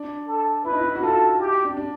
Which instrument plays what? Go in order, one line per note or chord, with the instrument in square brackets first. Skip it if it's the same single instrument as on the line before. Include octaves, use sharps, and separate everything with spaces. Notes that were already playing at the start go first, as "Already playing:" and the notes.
Already playing: [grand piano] D4
[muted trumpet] A4
[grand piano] E4 [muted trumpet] B4
[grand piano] D#4
E4
F#4
[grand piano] F4 [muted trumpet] A4
[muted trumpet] G4
[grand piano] D4
D4